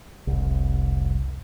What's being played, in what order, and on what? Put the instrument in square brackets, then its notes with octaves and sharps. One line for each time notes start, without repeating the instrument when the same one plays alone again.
[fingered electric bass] F1 C2